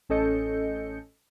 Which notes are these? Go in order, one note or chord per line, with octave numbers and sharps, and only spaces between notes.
A1 C#4 A4 D#5 G6 C#7